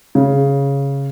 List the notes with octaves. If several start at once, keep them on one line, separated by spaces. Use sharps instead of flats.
C#3